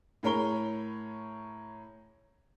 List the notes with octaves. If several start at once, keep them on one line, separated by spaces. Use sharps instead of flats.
A2 G#4 A#4 C#5 B5 G7